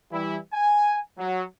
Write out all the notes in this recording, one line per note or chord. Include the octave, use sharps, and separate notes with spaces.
E3 G3 E4
G#5
F#3